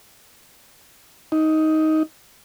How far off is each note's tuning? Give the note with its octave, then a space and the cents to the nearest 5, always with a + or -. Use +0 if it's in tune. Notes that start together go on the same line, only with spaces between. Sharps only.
D#4 +15